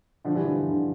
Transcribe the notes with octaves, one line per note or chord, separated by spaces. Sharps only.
D3 F3
E3 G3
D3 F3
E3
D3